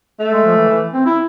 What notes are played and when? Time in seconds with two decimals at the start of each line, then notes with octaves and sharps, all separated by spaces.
0.20 A3
0.32 G#3
0.45 F3
0.56 E3
0.69 E3
0.93 C4
1.06 E4